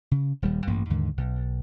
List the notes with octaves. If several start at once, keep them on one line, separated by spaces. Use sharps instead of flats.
C#3
D#1 D#2 G3
A1 G2 A#3
D#2 G#2 D3
B1